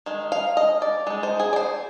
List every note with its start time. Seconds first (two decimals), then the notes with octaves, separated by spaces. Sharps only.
0.06 D#3 G#3
0.32 F5
0.57 D#5
0.82 D5
1.07 G#3 D#4
1.23 C5
1.40 G#4
1.53 D5
1.56 C5